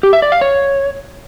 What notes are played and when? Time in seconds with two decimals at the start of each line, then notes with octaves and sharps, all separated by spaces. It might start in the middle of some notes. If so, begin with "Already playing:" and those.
0.03 G4
0.13 E5
0.22 D5
0.32 F5
0.41 C#5